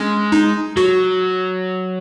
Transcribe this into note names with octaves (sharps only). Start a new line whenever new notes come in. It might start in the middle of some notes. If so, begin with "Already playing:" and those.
Already playing: G#3 C#4
D#4
F#3 F#4